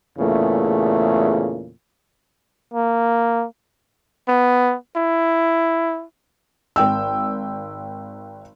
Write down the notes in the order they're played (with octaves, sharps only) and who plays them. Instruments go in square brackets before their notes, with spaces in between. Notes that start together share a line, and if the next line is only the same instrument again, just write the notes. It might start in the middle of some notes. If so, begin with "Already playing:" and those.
[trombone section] E2 A#2 C#3 A3
[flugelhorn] A#3
[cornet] B3
E4
[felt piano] G#1 G5 E6